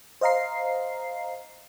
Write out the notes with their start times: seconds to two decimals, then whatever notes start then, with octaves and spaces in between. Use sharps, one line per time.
0.21 C5 D#5 F5 A#5 C7